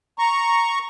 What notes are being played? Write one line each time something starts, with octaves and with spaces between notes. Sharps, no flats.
A#5 C#6